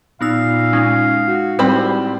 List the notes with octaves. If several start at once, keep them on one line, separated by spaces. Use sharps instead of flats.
A#2 B3 D#4 F5 E6
G#3 C#4 D#4
F#4
A2 G3 C4 B5